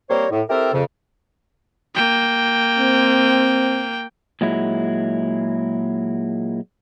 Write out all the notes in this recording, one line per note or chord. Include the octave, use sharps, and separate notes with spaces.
G3 A#3 C4 A#4 C5 C#5
A2
C4 E4 G4 A4 A#4
F2 C#3
A#3 G5
C4
A#2 F#3 G#3 E4